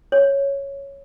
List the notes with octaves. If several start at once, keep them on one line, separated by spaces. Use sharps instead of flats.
C#5